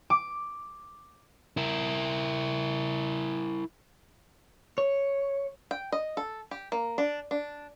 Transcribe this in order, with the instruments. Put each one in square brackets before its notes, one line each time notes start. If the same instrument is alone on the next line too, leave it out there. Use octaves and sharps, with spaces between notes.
[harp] D6
[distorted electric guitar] E4 A#4
[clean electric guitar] C#5
[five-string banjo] G5
D#5
A4
G4
A#3
D4
D4